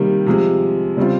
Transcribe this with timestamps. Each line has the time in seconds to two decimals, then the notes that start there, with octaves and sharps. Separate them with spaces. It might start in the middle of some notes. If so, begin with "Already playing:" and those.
Already playing: C3 D#3 G3 A#3
0.26 C3 F3 G#3
0.97 C#3 G3 C4 F4